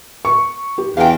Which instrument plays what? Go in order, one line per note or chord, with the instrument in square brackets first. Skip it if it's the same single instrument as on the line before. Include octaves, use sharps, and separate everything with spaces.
[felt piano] C#6
G4
[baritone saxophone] E2 [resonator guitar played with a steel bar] F5 G5